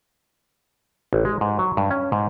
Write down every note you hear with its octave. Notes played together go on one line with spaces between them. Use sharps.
A1
G#3
G#2
F#3
G2
C#4
G#2